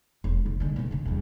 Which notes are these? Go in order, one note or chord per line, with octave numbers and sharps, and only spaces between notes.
E1
F1
D3 G#3
B2 D3
D2 C3
E2 G2